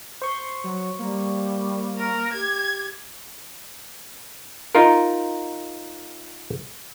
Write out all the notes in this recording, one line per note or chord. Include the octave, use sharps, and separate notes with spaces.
C5 C6 C#6
F#3
G3 A#3
A#4
G4 G#6
D#4 F4 A#4